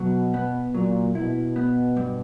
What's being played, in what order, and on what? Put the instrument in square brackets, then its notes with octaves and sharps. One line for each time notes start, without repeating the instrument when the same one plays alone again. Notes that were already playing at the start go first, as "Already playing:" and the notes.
Already playing: [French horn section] B2 [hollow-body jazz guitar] F#3
[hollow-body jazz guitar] B3
[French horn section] A#2 [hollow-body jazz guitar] F#3
[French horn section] B2 [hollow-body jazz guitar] E4
[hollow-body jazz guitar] B3
G2